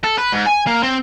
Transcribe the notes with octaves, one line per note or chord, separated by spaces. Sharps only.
A4
B4
G#2
G#5
A#3
C4